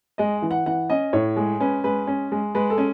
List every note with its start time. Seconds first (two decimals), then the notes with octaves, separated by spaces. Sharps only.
0.18 G#3 D#5
0.42 E3
0.51 F#5
0.66 E3 F#5
0.90 C#4 D#5
1.13 A2 C#5
1.36 G#3
1.60 C#4 B4
1.84 G#3 B4
2.07 C#4
2.32 G#3
2.55 G#3 B4
2.70 A4
2.78 C#4